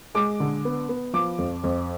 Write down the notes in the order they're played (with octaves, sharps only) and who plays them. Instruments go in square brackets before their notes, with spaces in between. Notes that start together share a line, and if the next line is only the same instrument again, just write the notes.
[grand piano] G#3 D6
D3
B3
B3
F3 D6
F2
F2